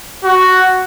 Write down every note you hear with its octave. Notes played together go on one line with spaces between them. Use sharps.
F#4